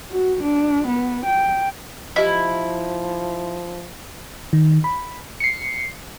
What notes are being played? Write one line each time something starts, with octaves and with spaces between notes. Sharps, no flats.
F#4
D4
B3
G5
F3 E4 G4 D#5
D#3
B5
C7 C#7